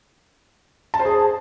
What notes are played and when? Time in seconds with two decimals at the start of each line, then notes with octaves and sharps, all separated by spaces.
0.94 A5
0.99 C5
1.05 G#4